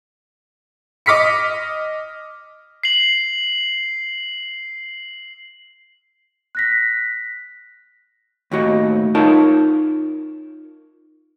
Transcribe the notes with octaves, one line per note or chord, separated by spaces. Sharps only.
D#5 D6 F6 B6 C#7
C7 F#7
F#6 A#6 B6
D#2 A2 F#4 D#5
D#4 F4 A#4 C#5 F#5 A5